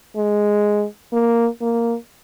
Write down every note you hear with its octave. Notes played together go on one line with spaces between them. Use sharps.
G#3
A#3
A#3